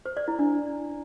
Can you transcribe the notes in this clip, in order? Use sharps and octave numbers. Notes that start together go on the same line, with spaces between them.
C5
D5
E4
D4